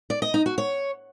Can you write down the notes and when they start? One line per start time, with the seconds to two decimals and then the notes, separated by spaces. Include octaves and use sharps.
0.10 D5
0.22 D#5
0.34 D#4
0.46 F#4
0.58 C#5